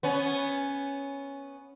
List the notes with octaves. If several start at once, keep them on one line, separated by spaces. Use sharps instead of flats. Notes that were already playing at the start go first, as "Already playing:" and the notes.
B3 C#4